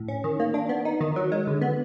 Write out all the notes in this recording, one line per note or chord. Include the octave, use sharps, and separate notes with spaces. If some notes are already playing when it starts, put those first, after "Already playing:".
Already playing: A2
C#4
D#3
A#3
D4
B3
D#4
D#3
F#3
G#3
D3
B3